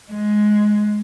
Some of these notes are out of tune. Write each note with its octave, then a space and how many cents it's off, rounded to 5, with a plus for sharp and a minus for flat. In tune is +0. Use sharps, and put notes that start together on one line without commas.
G#3 +10